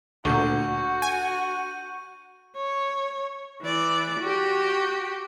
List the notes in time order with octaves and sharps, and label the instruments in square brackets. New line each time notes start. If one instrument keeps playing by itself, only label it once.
[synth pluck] D2 A#2 [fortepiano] D3 [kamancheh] F#4 [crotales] C#6 G6
[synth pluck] G#5 [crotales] D#7
[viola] C#5
E3 D5
F#4 G4